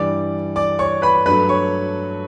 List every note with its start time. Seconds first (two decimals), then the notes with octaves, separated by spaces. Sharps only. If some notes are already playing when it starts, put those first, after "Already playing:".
Already playing: G2 E3 G3 D5 D6
0.56 D5 D6
0.79 C#5 C#6
1.02 B4 B5
1.26 G2 F#3 A3 B4 B5
1.49 C#5 C#6